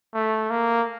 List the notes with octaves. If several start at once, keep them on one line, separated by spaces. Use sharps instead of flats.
A3
A#3